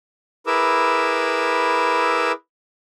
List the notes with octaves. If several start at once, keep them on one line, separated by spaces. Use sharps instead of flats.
E4 G#4 A#4 B4 D6 E6